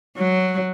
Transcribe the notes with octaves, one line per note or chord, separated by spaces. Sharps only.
F#3